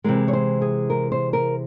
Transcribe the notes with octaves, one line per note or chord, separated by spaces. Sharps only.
C3 E3 G#3 A#4
C#5
C5
G#4
A#4
C5
A#4